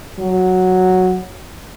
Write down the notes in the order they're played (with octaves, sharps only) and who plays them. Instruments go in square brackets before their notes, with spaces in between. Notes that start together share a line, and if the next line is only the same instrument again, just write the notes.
[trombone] F#3